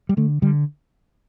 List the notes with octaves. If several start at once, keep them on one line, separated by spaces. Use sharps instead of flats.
G3
D3 A3
D3 G3